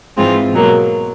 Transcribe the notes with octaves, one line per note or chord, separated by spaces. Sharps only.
G#2 E3 G#3 C4 F4
B2 F#3 A#3